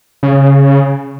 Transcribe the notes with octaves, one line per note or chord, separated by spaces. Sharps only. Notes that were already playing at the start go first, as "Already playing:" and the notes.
C#3